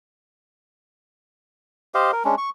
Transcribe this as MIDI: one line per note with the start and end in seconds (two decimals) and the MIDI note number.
1.94 2.11 67
1.94 2.11 72
1.94 2.11 75
1.94 2.11 77
2.13 2.23 70
2.25 2.35 56
2.25 2.35 61
2.25 2.35 62
2.38 2.50 85